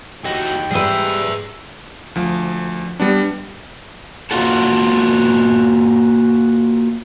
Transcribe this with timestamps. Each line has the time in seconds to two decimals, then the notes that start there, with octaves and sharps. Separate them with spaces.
0.25 A2 D#4 F#4 G4 G5
0.71 G#2 G3 G#4 B4 E5
2.15 D2 F3
3.00 G3 B3 D4
4.31 A#3 F4 F#4 A4